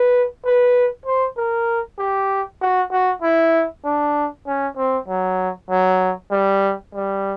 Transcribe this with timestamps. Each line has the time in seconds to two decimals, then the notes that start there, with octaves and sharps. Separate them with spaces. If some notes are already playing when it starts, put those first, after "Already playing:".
Already playing: B4
0.45 B4
1.06 C5
1.37 A#4
1.98 G4
2.61 F#4
2.91 F#4
3.22 E4
3.84 D4
4.47 C#4
4.77 C4
5.08 F#3
5.70 F#3
6.31 G3
6.94 G3